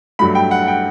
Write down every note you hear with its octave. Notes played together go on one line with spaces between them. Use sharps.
G2 F#3 A3 B5
G5
F#5
G5